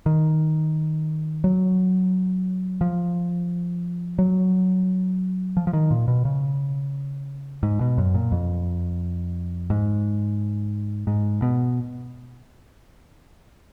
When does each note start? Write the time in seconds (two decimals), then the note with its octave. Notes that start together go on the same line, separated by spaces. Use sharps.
0.06 D#3
1.44 F#3
2.81 F3
4.18 F#3
5.57 F3
5.67 F3
5.73 D#3
5.91 A#2
6.08 B2
6.25 C#3
7.63 G#2
7.81 B2
7.98 F#2
8.14 A#2
8.32 F2
9.70 G#2
11.07 G#2
11.42 B2